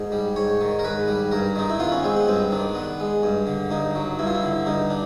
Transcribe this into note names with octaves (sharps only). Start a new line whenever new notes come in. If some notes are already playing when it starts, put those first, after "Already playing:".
Already playing: G#2 D#5
G3
G#2 C#5
D#3
A#4
G#2 B4
G3
G2 A#4
D#3 D#4
E4
B3 F4
C#4
G#3 C4
B3
G2 C4
D#3 D4
B3
G#3
G2
D3
G2 D#4
F#3
G2 E4
F4
E4
D3
G2 D#4
D4